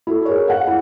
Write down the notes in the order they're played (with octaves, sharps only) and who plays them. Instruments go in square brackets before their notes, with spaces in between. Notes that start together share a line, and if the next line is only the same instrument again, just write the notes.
[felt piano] E4 F#4 A4
G#4 A#4 C#5
F5 F#5
E4